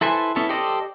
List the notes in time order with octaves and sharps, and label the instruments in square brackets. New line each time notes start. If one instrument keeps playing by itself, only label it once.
[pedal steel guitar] E4 A4 B4 C5 G#5
B3 C#4 E4 A4
G4 A4 C5 D5 D#5